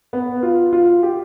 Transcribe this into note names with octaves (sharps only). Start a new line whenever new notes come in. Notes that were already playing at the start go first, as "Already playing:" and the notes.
B3
F4
F4
G4